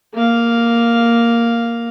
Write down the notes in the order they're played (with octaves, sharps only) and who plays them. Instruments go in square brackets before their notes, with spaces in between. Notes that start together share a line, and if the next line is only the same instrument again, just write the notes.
[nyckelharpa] A#3 F5